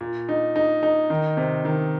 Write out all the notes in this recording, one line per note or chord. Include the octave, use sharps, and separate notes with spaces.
A#2
D#4
D#4
D#4
D#3
C3
D#3